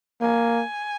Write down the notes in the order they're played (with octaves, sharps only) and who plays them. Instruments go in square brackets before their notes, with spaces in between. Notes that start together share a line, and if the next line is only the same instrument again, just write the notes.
[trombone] A#3 [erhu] G#5